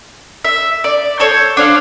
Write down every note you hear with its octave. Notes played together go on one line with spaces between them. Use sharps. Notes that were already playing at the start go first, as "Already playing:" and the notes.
E5
D5
A4 C5 C#5
D4 C5 F5